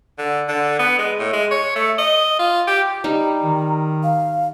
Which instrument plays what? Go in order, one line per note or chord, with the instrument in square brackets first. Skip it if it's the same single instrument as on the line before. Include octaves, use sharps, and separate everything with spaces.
[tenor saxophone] D3
D3
B3
G#3
A2
G#3
C#5
A3
D#5
F4
G4
[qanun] G3 D#4 [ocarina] A#5
[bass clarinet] D#3
[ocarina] F5